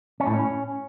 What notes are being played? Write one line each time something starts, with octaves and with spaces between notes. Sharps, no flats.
C#4
A2
C#4